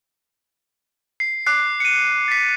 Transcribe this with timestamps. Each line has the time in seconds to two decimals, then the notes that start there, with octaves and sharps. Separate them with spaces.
1.20 C7
1.46 D6 F#6 C7
1.80 C#7 D#7
2.28 A6 B6